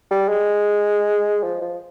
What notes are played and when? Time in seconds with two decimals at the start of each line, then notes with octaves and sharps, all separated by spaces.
0.11 G3
0.29 G#3
1.43 F3
1.62 F3